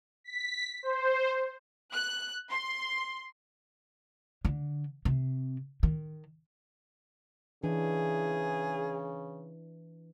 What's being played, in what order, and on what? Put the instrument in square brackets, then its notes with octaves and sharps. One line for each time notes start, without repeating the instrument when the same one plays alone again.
[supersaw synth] B6
C5
[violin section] F#6
C6
[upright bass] D3
C3
D#3
[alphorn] C#3 [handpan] E3 D4 [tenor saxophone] G#4